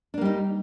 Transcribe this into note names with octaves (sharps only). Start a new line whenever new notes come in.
G3 A#3 D4 D#4